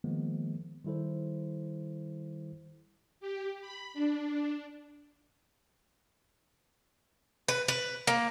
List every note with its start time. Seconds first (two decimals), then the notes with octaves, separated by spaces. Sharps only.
0.04 D#3 F3 G#3 A#3 B3
0.85 D#3 G3 E4 A4 C5
3.20 G4
3.61 B5
3.94 D4
7.48 B4
7.68 B4
8.07 A#3